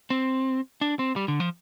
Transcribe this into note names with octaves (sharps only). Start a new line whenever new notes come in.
C4
D4
C4
G3
D3
F3